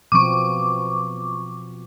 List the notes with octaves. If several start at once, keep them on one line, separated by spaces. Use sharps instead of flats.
B2 F3 C4 C#6 D6